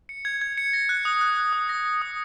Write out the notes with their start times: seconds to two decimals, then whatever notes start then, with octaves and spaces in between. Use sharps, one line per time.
0.09 C#7
0.25 G#6
0.41 G#6
0.58 C#7
0.73 A#6
0.89 F#6
1.05 D#6
1.21 F#6
1.37 F#6
1.53 D#6
1.69 A#6
1.85 A#6
2.02 D#6